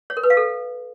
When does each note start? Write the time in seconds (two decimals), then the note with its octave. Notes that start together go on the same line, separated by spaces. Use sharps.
0.10 C#5
0.17 A#4
0.23 B4
0.30 F5
0.37 A4